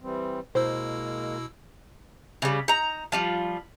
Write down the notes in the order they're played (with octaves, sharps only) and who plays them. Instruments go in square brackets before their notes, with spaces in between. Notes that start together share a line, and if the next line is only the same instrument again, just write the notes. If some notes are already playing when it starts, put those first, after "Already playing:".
[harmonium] E3 G3 C4
[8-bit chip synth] B2 E4 E6 [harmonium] G#3 A#3 A#4 [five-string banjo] C5
[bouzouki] C#3 G3
D#4 A#5
F3 G3 F4